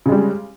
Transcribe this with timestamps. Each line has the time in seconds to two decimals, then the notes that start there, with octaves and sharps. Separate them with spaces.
0.06 C#3
0.09 G#3
0.12 G3